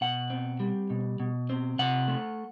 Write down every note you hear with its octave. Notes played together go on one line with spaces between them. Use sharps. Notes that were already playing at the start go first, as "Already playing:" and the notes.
B2 F#5
C4
G3
B2
B2
C4
C3 F#5
A3